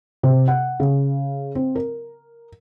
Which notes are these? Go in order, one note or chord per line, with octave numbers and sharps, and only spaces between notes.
C3
F#5
C#3
C4
A#4